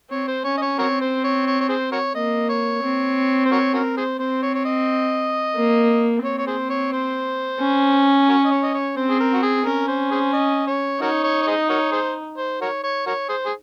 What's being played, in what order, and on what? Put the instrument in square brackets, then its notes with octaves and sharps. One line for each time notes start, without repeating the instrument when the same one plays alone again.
[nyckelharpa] C4 [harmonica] C#5
[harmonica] C5
[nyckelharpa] C#4 [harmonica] C#5
[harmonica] D#5
C#5
[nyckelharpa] C4 [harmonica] F#4 A#4 C#5
[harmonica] C5
C#5
C#5
C#5
G#4 C5
F#4 A#4 C#5
[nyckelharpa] A#3 [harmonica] D#5
[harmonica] C#5
[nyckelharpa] C4
[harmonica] C5
F#4 A#4 C#5
C#4 F#4 A#4
G#4 C5
[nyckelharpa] C4 [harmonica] C5
[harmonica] C#5
C#5
D#5
[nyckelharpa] A#3
[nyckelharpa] C4 [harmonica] C#5
[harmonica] C#5
G#4 C5
C#5
C5
[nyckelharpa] C#4
[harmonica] F#4 A#4 C#5
D#5
C#5
D#5
C#5
[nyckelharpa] C4 [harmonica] C5
[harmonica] G#4
A#4
F#4
G#4
[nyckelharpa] C#4 [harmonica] A#4
[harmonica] C5
G#4 C5
D#5
C#5
[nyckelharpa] D#4 [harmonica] F#4 A#4 C#5
[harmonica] C#5
C#5
G#4 C5 D#5
F#4 A#4 C#5
G#4 C5
C5
F#4 A#4 C#5
C#5
F#4 A#4 C#5
G#4 C5
G#4